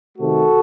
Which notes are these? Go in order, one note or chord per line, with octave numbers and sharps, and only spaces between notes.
C3 D#3 A3 F#4 A4